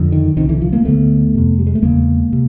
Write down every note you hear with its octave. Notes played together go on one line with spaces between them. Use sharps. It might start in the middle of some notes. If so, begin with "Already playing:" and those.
Already playing: F2 D3
D#3
C2 C3 D#3
D3 E3
D#3 F3
G#3 A#3
D2 D3 A3 B3
F2 C3
G3
G#3
A3
E2 C#3 G#3 A#3
C3